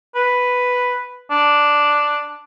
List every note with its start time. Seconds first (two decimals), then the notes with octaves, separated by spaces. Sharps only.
0.15 B4
1.31 D4